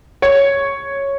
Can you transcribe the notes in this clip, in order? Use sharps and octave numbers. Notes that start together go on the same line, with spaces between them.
C#5